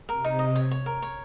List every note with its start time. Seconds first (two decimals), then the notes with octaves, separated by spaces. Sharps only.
0.09 C3 A#4
0.24 D#4
0.39 D#5
0.56 C#5
0.71 C#5
0.86 A#4
1.02 C#5